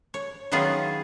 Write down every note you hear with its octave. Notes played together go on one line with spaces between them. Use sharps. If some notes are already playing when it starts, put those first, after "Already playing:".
C#5
D#3 F#3 B3 C#4 F4 G#4